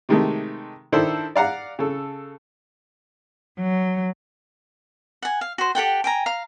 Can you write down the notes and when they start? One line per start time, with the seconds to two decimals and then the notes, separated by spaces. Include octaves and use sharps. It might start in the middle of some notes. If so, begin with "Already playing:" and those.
0.09 C3 D#3 G#3 A3
0.92 D#3 D4 E4 A4 C5
1.36 D5 F5 F#5 A#5
1.79 C#3 A4
3.59 F#3
5.22 F#5 G#5
5.41 F5
5.58 F#4 C5
5.75 G4 A4 F#5 G5
6.04 G5 G#5 A#5
6.26 F5 A#5